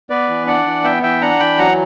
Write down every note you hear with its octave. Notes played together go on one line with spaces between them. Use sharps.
B3 B4 D5
E3
D4 D5 F#5
E3
B3 E5 G5
E3 E5 G5
D4 F#5 A#5
E3 G5 B5
F#3 F#5 A#5